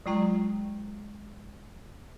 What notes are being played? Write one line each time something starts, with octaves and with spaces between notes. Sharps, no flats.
F#3 G#3 F4 G5 A#5